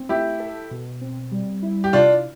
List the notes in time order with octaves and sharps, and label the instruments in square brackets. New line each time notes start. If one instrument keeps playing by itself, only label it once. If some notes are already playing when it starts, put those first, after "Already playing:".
Already playing: [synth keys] C4
[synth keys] A3 [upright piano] E4 G4
[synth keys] A4
B2
C4
G3
E4
[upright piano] G4
[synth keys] C3 [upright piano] D4 F4